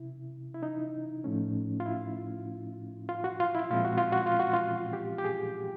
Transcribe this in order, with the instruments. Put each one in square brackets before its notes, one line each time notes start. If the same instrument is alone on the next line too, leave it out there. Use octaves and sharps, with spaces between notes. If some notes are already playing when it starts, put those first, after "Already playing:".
Already playing: [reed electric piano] C3 E4
E4
D#4
A2 F3 A3 C#4
F4
E4
F4
F#4
F4
E4
A#2 F3 G#3 C4 F4
F#4
F4
F#4
F4
F#4
F4
G4
G4
G#4